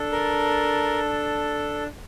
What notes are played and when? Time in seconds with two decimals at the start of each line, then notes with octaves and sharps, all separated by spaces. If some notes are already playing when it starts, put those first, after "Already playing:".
Already playing: D4 A4
0.12 A#4